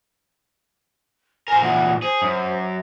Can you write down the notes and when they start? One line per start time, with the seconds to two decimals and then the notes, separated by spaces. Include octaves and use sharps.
1.48 A#4 C5 G#5
1.62 A#2 E3 F#5
2.02 G#4 C5
2.22 F#2